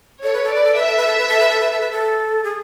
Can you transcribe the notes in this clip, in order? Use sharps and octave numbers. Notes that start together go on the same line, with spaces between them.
A4 C#5
B4
A4
B4 D5
A4
B4 E5
A4
B4
A4
B4
A4
B4
A4
B4
A4
B4
A4
G#4